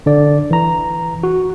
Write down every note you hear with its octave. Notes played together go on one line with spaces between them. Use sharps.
D3 D5
E3 A#5
F#4